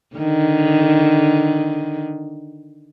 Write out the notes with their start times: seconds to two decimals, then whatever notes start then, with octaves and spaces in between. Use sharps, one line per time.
0.16 D3 D#3